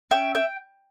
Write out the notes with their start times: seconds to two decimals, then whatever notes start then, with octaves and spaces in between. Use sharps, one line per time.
0.11 C#4 E5 G5
0.35 E5 G5